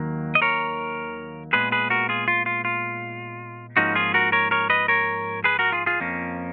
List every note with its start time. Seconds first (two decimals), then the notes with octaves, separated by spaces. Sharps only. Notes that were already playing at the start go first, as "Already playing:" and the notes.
Already playing: D#2 D#3 F#3 A#3
0.35 D#5
0.42 A#4 C#5
1.53 A#2 G#3 B3 G#4 B4
1.72 G#4 B4
1.90 F#4 A#4
2.09 F4 G#4
2.28 F4
2.46 F4
2.65 F4
3.77 G#2 F3 A#3 C#4 D#4 F#4
3.95 F4 G#4
4.14 F#4 A#4
4.32 A#4 C#5
4.51 A#4 C#5
4.70 B4 D#5
4.88 A#4 C#5
5.44 G#4 B4
5.59 F#4 A#4
5.72 F4 G#4
5.86 F4 G#4
6.00 F2 F3 A#3 C#4